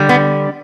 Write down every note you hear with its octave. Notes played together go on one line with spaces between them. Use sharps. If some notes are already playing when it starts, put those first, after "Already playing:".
Already playing: D3 G3
B3